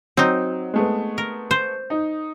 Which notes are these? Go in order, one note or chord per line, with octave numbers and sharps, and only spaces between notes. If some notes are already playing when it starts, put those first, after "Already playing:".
F#3 C4 D#4
G#3 A3 B3
A#4
C5
D#4